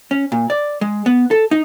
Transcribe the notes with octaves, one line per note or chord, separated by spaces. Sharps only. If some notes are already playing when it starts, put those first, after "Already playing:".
C#4
A#2
D5
G#3
B3
A4
D#4